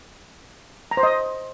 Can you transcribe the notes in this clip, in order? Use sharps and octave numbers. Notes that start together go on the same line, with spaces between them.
A#5
C5
D#5